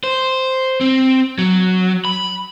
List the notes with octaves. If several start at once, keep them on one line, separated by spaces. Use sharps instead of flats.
C5
C4
F#3
B5